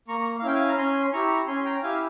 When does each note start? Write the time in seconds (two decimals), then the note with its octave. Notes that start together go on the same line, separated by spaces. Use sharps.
0.08 A#3 A#5 C#6
0.39 F5
0.43 C#4 E4 G5
0.54 F5 G#5
0.69 A#5
0.78 C#4 G#5 C6
1.13 E4 G4 A#5 C#6
1.47 C#4 G#5 C6
1.60 C6
1.65 G5 A#5
1.83 E4 G4 F5 G#5